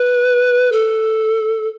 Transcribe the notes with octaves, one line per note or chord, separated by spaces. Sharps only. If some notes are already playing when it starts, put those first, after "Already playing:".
Already playing: B4
A4